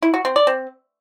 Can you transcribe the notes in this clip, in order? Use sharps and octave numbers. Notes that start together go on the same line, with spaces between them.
E4
F#4
C4
D5
C4